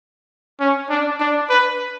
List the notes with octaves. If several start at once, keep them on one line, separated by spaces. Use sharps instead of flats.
C#4
D4
D4
B4